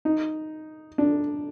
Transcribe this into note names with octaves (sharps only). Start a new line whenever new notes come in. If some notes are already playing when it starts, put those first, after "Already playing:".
D#4
D4